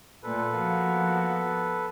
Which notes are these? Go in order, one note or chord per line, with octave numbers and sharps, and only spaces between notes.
A#2 A3 A4 B4
F3 A#3 B3 F#4